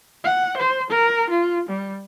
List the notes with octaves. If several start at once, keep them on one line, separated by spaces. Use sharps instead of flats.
F#5
C5
A#4
F4
G3